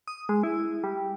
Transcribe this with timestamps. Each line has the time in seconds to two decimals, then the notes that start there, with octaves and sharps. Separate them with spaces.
0.08 D#6
0.29 G#3
0.43 E4
0.84 G3